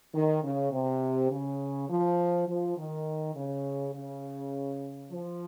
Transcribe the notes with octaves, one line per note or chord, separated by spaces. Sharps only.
D#3
C#3
C3
C#3
F3
F3
D#3
C#3
C#3
F3